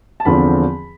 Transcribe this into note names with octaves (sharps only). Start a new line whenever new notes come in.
A5
E2 D3 F3 C4 B5